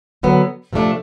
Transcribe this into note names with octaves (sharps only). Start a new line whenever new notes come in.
D3 F#3 B3
C3 F3 A3 D4